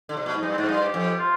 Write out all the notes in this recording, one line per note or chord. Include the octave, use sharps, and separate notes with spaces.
D3
C3
B2
G#2
G2 D#4
C4
G#2 D4
D#4
G2
F4
G4
F2
F4